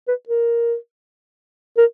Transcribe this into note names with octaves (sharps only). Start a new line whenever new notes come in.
B4
A#4
A#4